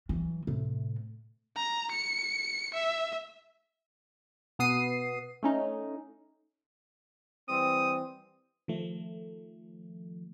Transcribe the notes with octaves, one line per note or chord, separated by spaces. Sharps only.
E3 F#3
A2 C3
A#5
C#7
E5
B2 B3 D#6 C7 D#7
A3 C#4 D#4
E3 G3 C4 D#6
D#3 F3 A3